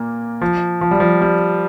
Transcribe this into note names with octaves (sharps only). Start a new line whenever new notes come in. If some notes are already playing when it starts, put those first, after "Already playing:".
Already playing: A#2 A#3
F3
F3
G3
F3
G3